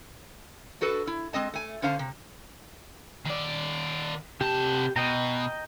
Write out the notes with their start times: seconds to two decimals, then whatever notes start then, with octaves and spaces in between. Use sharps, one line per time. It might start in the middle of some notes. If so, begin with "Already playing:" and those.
0.81 D4 F#4 A4 B4
1.07 E4
1.33 G#3 C4 D#5 A5
1.54 A3 G#5
1.82 D3 C#4 C5 F5 F#5 A5
1.99 C3
3.26 D#3 D5
4.41 C3 G4 A5
4.96 B2 D#5 G5 A#5